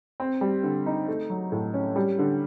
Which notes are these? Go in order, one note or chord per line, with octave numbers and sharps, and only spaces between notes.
C4
G3
D3
D#4
A3
F#3
A2
C#4
G3
D3